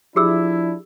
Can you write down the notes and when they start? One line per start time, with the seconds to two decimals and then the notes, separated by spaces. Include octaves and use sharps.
0.16 F3 D4 E4 G4 G#4 E6